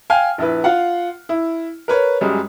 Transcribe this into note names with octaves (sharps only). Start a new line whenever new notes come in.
F5 G5 G#5 F6
A#1 E4 B4
F4 F5 F#5
E4
A#4 B4 C#5
F#2 G3 G#3